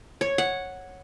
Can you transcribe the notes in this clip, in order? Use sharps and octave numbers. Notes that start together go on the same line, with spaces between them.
C#5
F#5